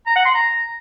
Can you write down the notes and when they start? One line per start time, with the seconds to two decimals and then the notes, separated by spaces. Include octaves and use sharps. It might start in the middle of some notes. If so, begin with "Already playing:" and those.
0.07 A#5
0.16 F#5
0.25 C6
0.34 A#5